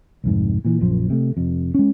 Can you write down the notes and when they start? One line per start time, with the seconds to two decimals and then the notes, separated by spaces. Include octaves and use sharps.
0.24 C2 F2 G#2
0.65 A#2 E3
0.81 A#1 F#2 F3
1.10 C3 A3
1.37 F1 F2
1.74 G#3 C#4